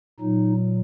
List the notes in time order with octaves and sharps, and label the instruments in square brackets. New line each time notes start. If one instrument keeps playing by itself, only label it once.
[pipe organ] A#2 F#3 D#4